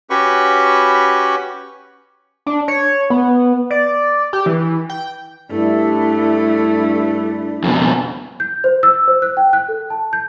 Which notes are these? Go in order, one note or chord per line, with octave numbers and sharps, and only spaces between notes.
C#4 F#4 G4 B4 B5 C#6
D4
C#5
B3
D5
G4
E3
G5
G2 A3 D4 E4
F2 B2
G6
C5
E6
C5
F#6
G5
F#6
A4
A5
G6